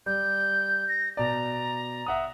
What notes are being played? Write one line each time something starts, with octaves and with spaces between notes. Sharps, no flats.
G3 G6
A#6
B2 D5 A#5
E5 F#5 D#6